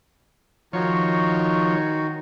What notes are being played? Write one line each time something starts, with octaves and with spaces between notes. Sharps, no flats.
D#3 F3 D#4 F#4 C#5